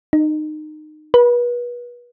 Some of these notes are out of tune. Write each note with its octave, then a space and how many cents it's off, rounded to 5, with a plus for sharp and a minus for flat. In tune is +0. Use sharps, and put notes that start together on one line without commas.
D#4 -25
B4 -35